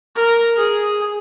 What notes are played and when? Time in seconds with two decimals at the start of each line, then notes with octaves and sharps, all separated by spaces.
0.15 A#4
0.57 G#4